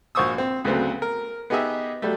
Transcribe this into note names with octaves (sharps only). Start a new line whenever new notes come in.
A#1 F#4 C5 C#6 D#6 E6
C4
D2 C#3 F#3 A3 B3 C4
A#4
B3 D#4 G4 G#4 D#5 E5
F#3 G3 A3